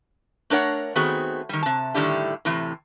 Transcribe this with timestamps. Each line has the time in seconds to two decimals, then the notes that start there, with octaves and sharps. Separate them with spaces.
0.50 A3 D4 A#4 C#5 F#5
0.95 D#3 A3 B3 C4 F#4 G#4
1.49 D#3 G3
1.63 C3 A5
1.94 A2 D3 D#3 G3 G4 E5
2.45 A2 C3 E3